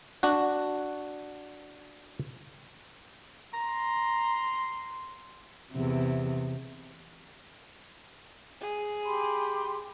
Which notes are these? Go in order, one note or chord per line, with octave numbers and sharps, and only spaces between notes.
D4 F#4
A#5 C6
E2 C3
G#4
G4 B5 C6